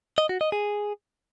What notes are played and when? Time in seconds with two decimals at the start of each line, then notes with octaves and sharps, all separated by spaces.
0.18 D#5
0.29 F#4
0.41 D#5
0.52 G#4